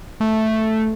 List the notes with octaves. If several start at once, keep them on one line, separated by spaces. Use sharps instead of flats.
A3